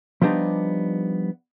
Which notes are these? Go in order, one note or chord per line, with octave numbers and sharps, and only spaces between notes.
F3 G3 B3 D4 D#4